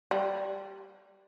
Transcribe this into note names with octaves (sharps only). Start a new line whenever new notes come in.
G3